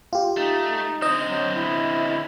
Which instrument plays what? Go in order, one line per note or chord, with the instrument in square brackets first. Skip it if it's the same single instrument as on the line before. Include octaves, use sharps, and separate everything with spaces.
[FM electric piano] F4 G4
[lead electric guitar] A3 [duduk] D#4
[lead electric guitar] D3 C4 [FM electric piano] D#5
[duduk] F#3
E4